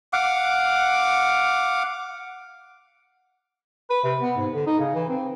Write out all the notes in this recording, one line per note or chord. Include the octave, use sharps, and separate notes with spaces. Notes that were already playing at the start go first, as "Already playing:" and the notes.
F5 F#5 D6
B4
C3
B3
G#2
D3
D#4
C#3
E3
C4